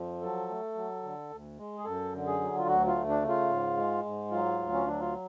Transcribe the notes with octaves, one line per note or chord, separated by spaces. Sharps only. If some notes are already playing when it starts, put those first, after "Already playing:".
Already playing: F2 F3
F#3 A4
A3
F#3
D3
D2
G#3
G#4
F#2 A4
D3
G#4
F#3
F4
D2 F#4
F4
A3
D4
C#3
F4
G#2
G#3
G#2
F#3 F4
D2
C#4
F#3 D4
F4